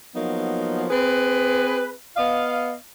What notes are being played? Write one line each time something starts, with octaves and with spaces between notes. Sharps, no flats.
F3 F#3 A#3 B3 D#4
C4 G#4 B4
B3 D#5 F5